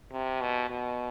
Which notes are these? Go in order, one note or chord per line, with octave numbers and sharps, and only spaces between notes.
C3
B2
B2